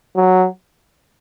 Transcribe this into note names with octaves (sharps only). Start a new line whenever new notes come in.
F#3